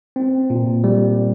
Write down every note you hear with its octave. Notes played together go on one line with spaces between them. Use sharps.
C4
A#2
G3